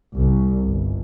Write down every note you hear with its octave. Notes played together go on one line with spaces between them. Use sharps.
C2
G1